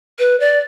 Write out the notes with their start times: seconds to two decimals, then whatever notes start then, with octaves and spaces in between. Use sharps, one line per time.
0.19 B4
0.40 D5